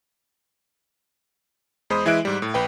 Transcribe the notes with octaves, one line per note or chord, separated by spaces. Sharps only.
E2 G#3 C5 B5 D#6
E3 G#3 E4 E5 F#6 D7
G#2 G3
A2
A#1 B4 G5